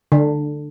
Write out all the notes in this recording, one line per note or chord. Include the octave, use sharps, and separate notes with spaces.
D3